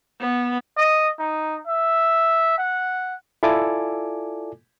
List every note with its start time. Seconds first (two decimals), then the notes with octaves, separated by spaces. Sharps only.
0.20 B3
0.77 D#5
1.19 D#4
1.67 E5
2.58 F#5
3.43 E4 F4 A4 D5 G#5 D6